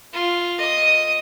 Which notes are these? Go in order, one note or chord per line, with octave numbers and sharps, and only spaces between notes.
F4
D#5 D#6